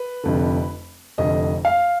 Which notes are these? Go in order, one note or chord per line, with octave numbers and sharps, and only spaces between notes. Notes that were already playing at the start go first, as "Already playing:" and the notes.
Already playing: B4
F1 F2 D3
F1 F2 D3 D#5
F5